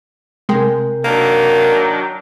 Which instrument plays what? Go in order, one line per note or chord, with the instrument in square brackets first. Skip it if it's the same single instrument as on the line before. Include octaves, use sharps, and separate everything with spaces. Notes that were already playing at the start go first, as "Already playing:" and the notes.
[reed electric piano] C3 A#4 G5 [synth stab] G#3
[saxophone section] D#3 F#3 D4 [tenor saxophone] A#3